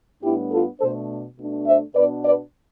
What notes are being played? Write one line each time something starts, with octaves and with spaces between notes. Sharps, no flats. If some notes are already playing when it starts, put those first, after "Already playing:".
A2 G3 B3 D4 E4 G4
F4 A4
B2 A3 D4 A4 C5
B2 A3 D4
C5 E5
B2 B3 D4 B4 D5
B4 D5